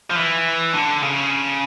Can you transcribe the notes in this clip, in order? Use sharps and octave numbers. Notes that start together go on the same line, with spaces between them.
F3
E3
D3
C#3